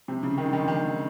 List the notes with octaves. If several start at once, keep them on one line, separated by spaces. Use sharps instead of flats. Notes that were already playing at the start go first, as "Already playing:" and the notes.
C3
C#3
D#3
D3
D#3
D#3